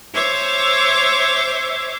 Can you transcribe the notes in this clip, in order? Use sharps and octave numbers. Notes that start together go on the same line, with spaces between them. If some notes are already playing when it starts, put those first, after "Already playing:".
C5 C#5 E5 D6